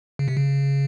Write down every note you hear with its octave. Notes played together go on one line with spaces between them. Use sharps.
C#3
C3
C#3